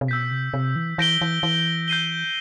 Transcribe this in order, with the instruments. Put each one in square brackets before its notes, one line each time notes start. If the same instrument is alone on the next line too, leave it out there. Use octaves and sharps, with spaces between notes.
[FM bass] C3
[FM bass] B2 [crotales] E6 G6 B6
[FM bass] C3
C3
E3
[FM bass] E3 [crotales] G6 A#6 D7 G7
[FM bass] E3
E3
[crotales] G6 C7 D#7 G7